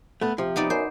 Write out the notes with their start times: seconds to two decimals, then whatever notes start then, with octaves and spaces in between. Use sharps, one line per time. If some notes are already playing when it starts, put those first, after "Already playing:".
0.21 A3 B3
0.38 C3 F3
0.56 B3 D#4 D5
0.70 F#2 C5